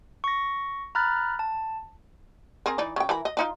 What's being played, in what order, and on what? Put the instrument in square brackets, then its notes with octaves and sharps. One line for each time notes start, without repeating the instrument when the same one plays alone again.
[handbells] C#6 A#6
A#5 B5 F6 F#6 A6
A5
[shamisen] C4 G#4 A#4
E3 D#4 D5
C#3 G5
E3 A#4 B5
D#5
D4 D#4 F4